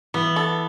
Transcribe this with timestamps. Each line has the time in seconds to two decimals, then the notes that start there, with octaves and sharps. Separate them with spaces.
0.14 E3 B3
0.36 A4